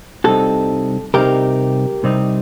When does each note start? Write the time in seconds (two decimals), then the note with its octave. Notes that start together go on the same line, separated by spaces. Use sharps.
0.24 C2 C3 G3 C4 D#4 F#4 A4
1.14 C2 C3 G3 C4 D#4 G4 A#4
2.03 C2 C3 G3 C4 D#4